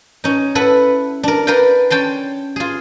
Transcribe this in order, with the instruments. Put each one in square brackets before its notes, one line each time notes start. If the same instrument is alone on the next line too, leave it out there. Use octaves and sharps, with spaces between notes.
[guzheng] C#4 D#4
E4 A4 B4 F#5
D4 A#4
A#4 B4 D5 F5 G5
C#4 G5 A5 C6
F4 G#4